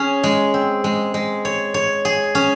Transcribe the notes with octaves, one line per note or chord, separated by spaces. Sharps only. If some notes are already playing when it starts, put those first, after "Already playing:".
Already playing: C#4 G#4
G#3
C4
G#3
G#3
C#5
C#5
G#4
C#4